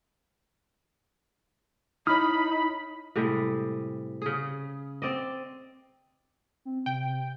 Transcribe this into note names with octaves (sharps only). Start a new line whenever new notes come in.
D#4 E4 C#5 B5 D#6 F6
A2 C3 G3 G#3
C#3 G#4
C4 D5 D#5
C4
C3 G5